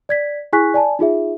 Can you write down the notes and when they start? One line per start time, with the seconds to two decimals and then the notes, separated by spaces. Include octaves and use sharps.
0.09 D5 G#6 B6
0.53 E4 G#4 G#5 C#6 F#6 B6
0.74 D5 G#5 A5
0.99 D#4 F4 G#4 E5